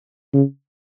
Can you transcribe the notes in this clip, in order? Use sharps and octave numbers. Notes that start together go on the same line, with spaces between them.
C#3